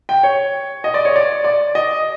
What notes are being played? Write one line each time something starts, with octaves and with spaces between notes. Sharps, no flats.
G5
C#5
D#5
D5
C#5
D5
D5
D#5